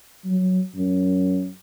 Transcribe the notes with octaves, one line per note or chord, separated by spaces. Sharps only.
F#3
F#2